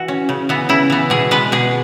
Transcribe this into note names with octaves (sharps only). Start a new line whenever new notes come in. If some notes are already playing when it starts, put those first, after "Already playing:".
Already playing: E3 F#4
C#4
C#3
E3 B3
C#3 E4
E3 B3
B2 G#4
G#3 B3 B4
B2 G#4